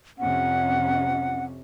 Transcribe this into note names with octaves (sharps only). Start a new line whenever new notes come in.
F2 C3 C#4 F#5